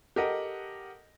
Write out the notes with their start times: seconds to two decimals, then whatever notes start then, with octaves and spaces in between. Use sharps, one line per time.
0.16 G4 A4 A#4 D#5 F#5